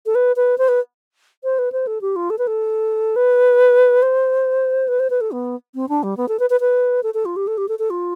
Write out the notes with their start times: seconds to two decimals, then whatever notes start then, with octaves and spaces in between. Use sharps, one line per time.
0.06 A4
0.15 B4
0.36 B4
0.58 C5
0.68 B4
1.44 C5
1.59 B4
1.72 C5
1.87 A4
2.01 G4
2.16 F4
2.30 A4
2.39 B4
2.47 A4
3.16 B4
4.02 C5
4.88 B4
5.00 C5
5.10 B4
5.21 A4
5.32 B3
5.75 C4
5.89 D4
6.03 G3
6.17 B3
6.29 A4
6.39 B4
6.50 B4
6.60 B4
7.03 A4
7.14 A4
7.25 F4
7.36 G4
7.47 A4
7.58 G4
7.69 A4
7.79 A4
7.90 F4